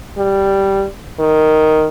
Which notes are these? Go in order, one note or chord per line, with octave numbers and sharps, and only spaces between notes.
G3
D#3